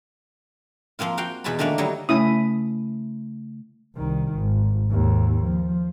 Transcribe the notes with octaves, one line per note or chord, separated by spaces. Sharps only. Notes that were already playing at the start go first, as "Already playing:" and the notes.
F3 A#3 C4 F4
F#4 F5 G5
E2 B2 G#5 A5 B5
D3 D#3 A3 A#3 D4
F#3 G3 D#4 E4
C#3 A3 C#4 E4 D#6
C2 D#3
G#1
D#2 G#2
F3